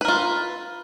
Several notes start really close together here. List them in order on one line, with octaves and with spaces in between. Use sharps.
B4 A#4 F4